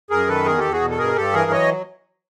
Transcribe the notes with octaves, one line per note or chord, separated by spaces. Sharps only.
F#2 G#4 A#4
D#3 A4 B4
E2 G#4 A#4
E2 G4 A4
F#4 G#4
B2
A4
G2 G#4 A#4
G2 G4 A4
E3 G#4 A#4
F#3 C#5 D#5